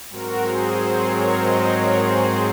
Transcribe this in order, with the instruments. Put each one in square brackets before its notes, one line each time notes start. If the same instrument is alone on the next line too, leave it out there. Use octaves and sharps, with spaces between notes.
[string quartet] G#2 F#3 C4 [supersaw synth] F#4 A#4
[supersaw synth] G#4 C5
G#4 C5
A#4 C#5
C5 D#5
A#4 C#5
G#4 C5